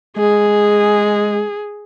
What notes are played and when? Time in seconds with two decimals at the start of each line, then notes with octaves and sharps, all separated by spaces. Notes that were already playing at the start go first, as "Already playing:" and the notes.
0.17 G#3 G#4